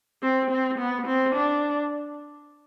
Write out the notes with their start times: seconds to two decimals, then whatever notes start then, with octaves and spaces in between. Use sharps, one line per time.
0.22 C4
0.51 C4
0.79 B3
1.06 C4
1.35 D4